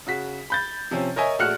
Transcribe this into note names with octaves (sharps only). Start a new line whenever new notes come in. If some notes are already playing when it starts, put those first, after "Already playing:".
C#3 F#4 B6
B5 G6 A6
C3 F3 C4 C#4
A#4 C#5 D#5 E5 G#5
A#1 A3 F#4 F6 F#6 C#7